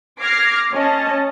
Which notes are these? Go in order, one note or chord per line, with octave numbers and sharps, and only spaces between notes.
D6 F6 G#6 A#6 C7
C#4 D#5 A5